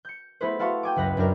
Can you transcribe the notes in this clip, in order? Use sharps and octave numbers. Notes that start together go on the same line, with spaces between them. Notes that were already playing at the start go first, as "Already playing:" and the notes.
G6 C#7
A3 B3 E4 G#4 B4 C5
E4 F#4 F5 A5 C6 C#6
G5 G#5 D6
C#2 F#2 B4 F#6 A#6
F#2 D4 G4 A#4